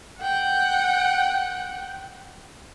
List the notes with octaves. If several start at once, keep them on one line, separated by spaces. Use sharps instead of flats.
F#5 G5